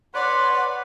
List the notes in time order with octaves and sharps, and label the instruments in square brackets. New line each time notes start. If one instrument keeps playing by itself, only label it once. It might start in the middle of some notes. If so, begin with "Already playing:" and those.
[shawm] B4 [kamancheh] C#5 D5 [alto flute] F#5 [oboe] C6